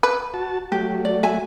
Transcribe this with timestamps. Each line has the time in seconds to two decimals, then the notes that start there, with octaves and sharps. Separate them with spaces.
0.03 B4
0.34 F#4 A5
0.72 F#3 A3 G4
1.05 D5
1.23 E5 G#5